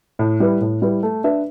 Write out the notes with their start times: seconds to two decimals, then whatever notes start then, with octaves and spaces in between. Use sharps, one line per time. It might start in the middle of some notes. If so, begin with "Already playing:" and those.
0.19 A2
0.40 G3 E4 B4
0.61 A2
0.82 G3 E4 B4
1.03 A3
1.24 D4 B4 E5